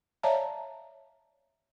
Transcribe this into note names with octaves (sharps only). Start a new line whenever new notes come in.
C#5 D5 E5 F5 A5 A#5